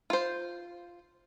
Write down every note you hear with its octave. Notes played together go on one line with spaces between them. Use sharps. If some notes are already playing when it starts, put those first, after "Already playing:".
F4 C5